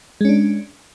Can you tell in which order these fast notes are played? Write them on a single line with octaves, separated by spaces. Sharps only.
G#3 C#4 D4